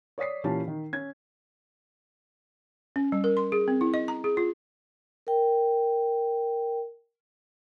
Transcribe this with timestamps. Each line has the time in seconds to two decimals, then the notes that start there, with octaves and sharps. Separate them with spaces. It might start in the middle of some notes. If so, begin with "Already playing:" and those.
0.18 C#5 D5 D#6 B6 C7
0.44 A#2 E3 C#4 G4 A5
0.68 D#3
0.93 C#4 G#6
2.96 C#4
3.12 G3
3.24 A#4
3.37 C6
3.52 G#4
3.68 C4
3.81 E4
3.94 D#5
4.08 A#5
4.24 G#4
4.37 F4
5.27 A#4 G5